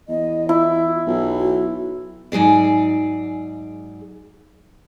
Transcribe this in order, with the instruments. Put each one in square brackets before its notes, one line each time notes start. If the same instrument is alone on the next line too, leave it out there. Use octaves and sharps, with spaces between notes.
[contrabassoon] E2 [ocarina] D#5
[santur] E4 [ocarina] F4
[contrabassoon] B1
[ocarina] F#4
[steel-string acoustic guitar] G#2 F#3 G#4 D5